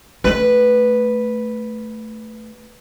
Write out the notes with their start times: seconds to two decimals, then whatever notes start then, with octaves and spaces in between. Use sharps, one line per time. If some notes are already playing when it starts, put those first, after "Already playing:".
0.24 A3 B4